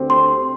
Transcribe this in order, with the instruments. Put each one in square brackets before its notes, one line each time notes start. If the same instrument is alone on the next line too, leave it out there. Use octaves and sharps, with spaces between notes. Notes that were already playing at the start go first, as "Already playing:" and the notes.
Already playing: [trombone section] D2 D3 C4 G4
[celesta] C6